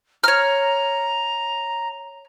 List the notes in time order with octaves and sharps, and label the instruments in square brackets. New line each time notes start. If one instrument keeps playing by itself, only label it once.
[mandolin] C#5 F6 [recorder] A#5